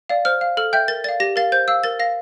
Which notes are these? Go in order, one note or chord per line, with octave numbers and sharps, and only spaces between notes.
D5 F5
C5 F6
F5
A4 F6
E5 G5 G6
A#4 A6
D5 F5 A6
G4 A#6
A#4 F5 A6
C5 G6
F5 E6
A#4 A6
F5 A#6